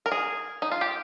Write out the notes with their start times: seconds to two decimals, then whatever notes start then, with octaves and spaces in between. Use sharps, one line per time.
0.06 A#4
0.12 G#4
0.62 D#4
0.71 F4
0.81 G4